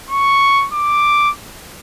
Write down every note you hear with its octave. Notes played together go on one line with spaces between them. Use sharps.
C#6
D6